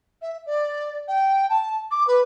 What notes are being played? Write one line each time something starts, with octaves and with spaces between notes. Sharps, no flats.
E5
D5
G5
A5
D6
B4